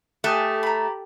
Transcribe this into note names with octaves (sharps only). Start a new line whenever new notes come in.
A3 G4 G#5 D#6 F#6
A#5 B5